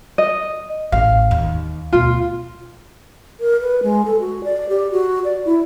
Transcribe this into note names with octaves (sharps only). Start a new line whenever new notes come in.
D#5
A1 F5
D#2
D2 B2 F4
A#4
B4
G#3
A4
F#4
D5
G4
F#4
D5
E4